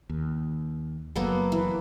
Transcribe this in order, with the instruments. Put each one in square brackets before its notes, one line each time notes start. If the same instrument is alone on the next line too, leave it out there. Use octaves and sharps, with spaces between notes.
[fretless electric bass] D#2
[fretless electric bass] F#1 F#3 [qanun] A#3 B3 A4
[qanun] E3